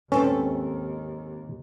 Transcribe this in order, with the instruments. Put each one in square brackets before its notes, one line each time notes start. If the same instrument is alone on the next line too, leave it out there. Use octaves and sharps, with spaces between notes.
[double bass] D#2 [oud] G#2 C4 A4 [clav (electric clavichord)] C#4 [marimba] B4